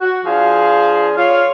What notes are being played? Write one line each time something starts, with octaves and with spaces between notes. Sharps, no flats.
F#4
F3 D4 G#4 F5
F4 C#5 F5